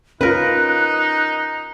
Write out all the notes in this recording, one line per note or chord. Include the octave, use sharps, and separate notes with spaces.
C#4 D#4 F4 A#4 B4 F#6